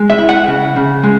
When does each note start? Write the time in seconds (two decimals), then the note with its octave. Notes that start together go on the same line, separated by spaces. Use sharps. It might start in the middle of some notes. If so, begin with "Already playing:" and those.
Already playing: G#3
0.10 E5
0.18 E4
0.29 F#5
0.47 C#3
0.76 C#3
1.04 G#3